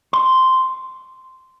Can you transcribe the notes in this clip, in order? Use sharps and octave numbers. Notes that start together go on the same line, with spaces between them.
C6